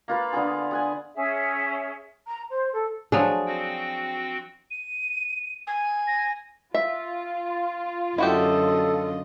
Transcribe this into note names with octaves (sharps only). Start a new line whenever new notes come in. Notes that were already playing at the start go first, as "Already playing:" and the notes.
A#3 F4 B4
D3 B3 F4 G#4
G#4 F#5 G#5
C#4 G#4 E5
A#5
C5
A4
F3 F#3 D4 G#4
C4 F#4 G5
D#7
G#5
A#6
F4 E5
F#2 D3 E4 F#4 G4 A4 D#5